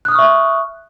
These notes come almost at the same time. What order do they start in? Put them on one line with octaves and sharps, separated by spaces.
F#6 D#6 F6 C#6 E5